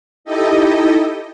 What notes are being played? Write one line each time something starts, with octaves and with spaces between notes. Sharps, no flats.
D#4 E4 G4 A4 D#5